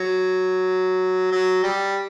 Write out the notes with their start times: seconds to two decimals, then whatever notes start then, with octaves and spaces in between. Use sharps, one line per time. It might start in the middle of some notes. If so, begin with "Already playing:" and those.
Already playing: F#3
1.31 F#3
1.63 G3